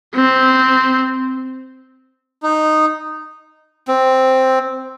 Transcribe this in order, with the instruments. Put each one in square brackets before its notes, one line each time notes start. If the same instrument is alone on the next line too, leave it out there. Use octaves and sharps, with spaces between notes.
[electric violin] C4
[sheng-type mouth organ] D#4
[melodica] C4